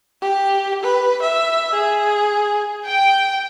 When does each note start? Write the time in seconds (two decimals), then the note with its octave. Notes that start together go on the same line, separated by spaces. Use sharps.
0.22 G4
0.83 B4
1.22 E5
1.74 G#4
2.86 G5